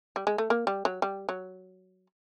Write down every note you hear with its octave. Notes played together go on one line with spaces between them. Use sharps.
G3
G#3
A3
A#3
G3
F#3
G3
F#3